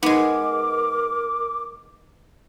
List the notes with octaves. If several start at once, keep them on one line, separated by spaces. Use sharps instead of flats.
G#3 B3 D#4 A#4 D6